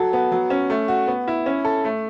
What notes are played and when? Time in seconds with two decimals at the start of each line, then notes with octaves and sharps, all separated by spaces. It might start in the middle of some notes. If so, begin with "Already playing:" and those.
Already playing: F#3 A4
0.13 B3
0.32 F#3
0.50 C#4
0.70 A3
0.88 F#4
1.07 B3
1.28 E4
1.46 C#4
1.65 A4
1.85 A3